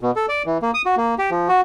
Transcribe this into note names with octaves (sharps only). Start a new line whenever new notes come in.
B2
A4
D5
E3
A#3
D#6
F#4
A#3
G4
F3
F#4